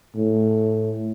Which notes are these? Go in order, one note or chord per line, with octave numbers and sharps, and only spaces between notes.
A2